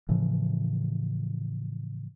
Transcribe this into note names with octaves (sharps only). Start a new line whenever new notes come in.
A2 C#3 E3 F3